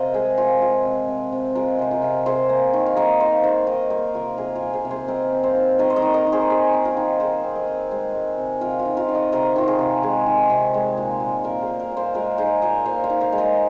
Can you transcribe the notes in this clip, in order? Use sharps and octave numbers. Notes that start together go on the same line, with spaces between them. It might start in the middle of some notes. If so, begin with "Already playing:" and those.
Already playing: C3 A#4 C5 D#5 F5
G#3 G#4
F3 F4
G#3 F4
C3
C3
C3
G#3 F4 A#4
C3 C5
F4 A#4
C3
C3 G#4 C5
A#3
D#3
F5
A#3 A#4 D#5
D#3 C5 F5
D#3 C5 F5
D#3 A#4 D#5
A#3 A#4 D#5
C3 F4 A#4
C3 G#4
F4 A#4
A#3
G#4 C5
C3
G#4 C5
C4 A#4 D#5
C4
C5 F5
D#4
D#3 A#4 D#5
C5
A#4 D#5
D#3
A#4 D#5
D#4
G#4 C5
D#4 G#4
C4
F4 A#4
D#3
D#3 G#4 C5
C4
A#4 D#5
C4
G#3 G#4 C5
G#3
C3
C3 F4 A#4
F4
D#3
F4 A#4
D#3
A#4 D#5
C3 A#4 D#5
D#3 F4
G#4
C3
G#3 G#4
D#3
C3
G#3
A#2
A#2
A#2 F4 A#4
G#4 C5
A#2
A#4 D#5
A#2
C5 F5
G#3 F4 A#4
D#4 G#4 C5
A#2 A#4 D#5
A#2 C5 F5
C5 F5
D#4
C5 F5
G#3
A#4 D#5